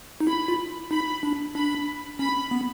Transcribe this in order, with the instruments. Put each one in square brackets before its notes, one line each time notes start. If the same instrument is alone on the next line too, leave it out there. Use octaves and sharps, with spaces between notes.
[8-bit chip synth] D#4
[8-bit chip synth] E4 [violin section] B5
[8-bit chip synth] F4
[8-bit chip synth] D#4 [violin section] B5
[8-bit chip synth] D4
[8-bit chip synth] D4 [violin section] B5
[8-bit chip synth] C#4 [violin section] B5
[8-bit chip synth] B3